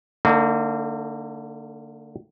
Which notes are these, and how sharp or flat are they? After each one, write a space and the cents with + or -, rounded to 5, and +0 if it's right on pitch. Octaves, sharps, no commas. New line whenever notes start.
D3 +0 A#3 -35 D#4 +25